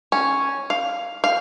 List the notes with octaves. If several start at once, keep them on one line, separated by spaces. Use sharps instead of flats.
C#4
F5
F5